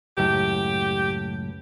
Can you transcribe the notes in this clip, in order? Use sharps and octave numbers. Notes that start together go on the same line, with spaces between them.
C#2 F#2 A2 G4